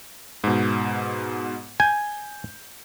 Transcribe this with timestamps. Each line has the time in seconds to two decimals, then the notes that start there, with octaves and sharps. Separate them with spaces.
0.44 G#2 B2
1.80 G#5 G6